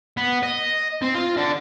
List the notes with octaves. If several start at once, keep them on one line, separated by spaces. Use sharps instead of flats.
B3
D#5
C4
F4
D3